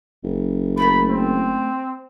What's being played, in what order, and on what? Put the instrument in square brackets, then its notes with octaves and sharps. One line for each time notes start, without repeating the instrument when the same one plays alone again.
[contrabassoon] F#1
[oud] A3 E4 A#4 [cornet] B5
[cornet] C4